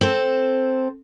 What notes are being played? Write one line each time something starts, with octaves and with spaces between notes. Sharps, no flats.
C4 A4 C5